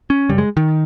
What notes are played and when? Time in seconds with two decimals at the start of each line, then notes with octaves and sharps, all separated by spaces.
0.10 C#4
0.29 F#2 C#3 G3
0.38 G#3
0.57 D#3